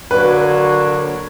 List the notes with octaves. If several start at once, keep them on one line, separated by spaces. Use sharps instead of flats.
D3 F#3 A#3 D4 F#4 B4